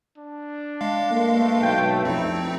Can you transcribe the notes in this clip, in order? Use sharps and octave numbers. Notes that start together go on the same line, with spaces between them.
D4
G#3 F5
G2 A3 A#3
B1 G5
F2 C4 D#4 E4